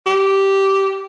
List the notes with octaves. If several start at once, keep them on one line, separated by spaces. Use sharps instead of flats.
G4